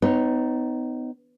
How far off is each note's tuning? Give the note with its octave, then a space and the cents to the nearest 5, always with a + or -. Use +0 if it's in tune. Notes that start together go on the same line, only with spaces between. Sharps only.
B3 +35 D#4 +0 C#5 +0